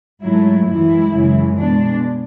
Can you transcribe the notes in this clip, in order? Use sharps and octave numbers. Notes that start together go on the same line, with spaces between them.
G#2 F#3 A3 E4
F#2 E3 G#3 E4
F#2 C#3 E3 G#3
B2 G#3 D4